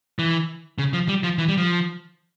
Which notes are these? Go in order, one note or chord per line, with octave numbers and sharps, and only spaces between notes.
E3
C#3
F3
G3
F3
E3
G3
F3